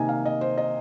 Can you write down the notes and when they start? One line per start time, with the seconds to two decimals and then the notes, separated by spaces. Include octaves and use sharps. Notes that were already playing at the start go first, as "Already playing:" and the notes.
Already playing: C3 D#3 A#3 D#4 G#5
0.09 F5
0.26 D#5
0.41 C5
0.58 D#5